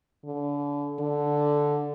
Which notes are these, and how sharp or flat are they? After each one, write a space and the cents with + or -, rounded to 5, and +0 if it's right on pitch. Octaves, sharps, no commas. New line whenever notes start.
D3 -30
D3 -5